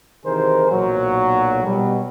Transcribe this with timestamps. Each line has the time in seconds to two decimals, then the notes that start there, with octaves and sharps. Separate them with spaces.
0.24 C3 D#3 E3 G#4 A#4 C5
0.70 B1 A#2 F#3
1.64 B2 G3